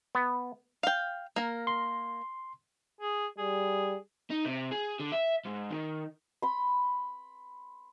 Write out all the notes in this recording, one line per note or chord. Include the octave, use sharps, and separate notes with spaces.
B3
F5 G5
A#3 A#4
C6
G#4
G3 G#4
D#4
C3
G#4
D3
E5
G#2
D#3
B5 C6